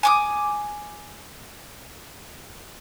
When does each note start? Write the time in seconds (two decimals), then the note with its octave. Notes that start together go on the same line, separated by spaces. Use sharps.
0.03 G#5 D6 D#6